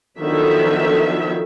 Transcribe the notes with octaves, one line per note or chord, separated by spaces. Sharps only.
D3 D#3 F3 F#3 B3 E5